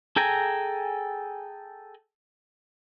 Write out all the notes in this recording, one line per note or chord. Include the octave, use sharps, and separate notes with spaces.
G#4 A4 G5 G#5 A#5